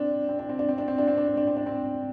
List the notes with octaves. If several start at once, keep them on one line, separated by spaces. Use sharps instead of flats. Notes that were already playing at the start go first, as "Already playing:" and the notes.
Already playing: C4 D4
C4
D4
C4
D4
C4
D4
C4
D4
C4
D4
C4
D4
C4
D4
C4